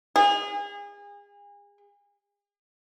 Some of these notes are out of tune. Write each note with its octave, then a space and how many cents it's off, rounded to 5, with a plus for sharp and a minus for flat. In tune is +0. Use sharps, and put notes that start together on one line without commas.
G#4 -35